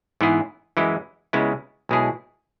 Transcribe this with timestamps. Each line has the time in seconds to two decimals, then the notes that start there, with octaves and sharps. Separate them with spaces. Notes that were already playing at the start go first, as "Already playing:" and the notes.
0.21 G#2 E3 B3 E4 G#4
0.77 F#2 E3 G#3 E4
1.33 C#2 C#3 G#3 B3 E4
1.89 B1 B2 G#3 E4 G#4